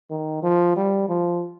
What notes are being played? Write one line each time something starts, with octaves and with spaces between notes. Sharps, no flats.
D#3
F3
G3
F3